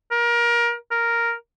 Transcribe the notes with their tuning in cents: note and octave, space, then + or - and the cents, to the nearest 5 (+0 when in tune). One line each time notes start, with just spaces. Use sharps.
A#4 +25
A#4 +0